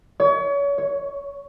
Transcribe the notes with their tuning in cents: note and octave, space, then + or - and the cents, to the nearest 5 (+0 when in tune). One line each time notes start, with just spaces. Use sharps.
C#5 +35
C#5 +5